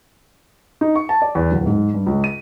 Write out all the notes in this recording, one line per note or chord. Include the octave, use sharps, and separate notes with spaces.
D#4
C#6
A5
D5
E2
D1
G#2
G2
C#2
D#7